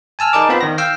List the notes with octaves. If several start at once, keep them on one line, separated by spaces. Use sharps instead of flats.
G#5 A5 E6 F6
D#4 G#4 A#4 D5 A5 D6
B3 C4 F4 D5 B5
D#3 A#6
F5 G5 E6